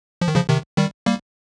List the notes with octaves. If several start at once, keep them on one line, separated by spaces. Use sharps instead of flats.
F3
D#3
C#3 F3
C3 D#3
D#3 G3
G3 A#3